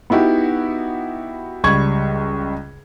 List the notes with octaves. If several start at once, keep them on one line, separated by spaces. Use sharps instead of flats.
B3 D#4 E4 F#4 G4
C#2 G3 C#6 G#6